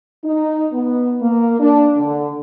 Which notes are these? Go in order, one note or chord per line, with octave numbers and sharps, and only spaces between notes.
D#4
B3
A#3
D4
D3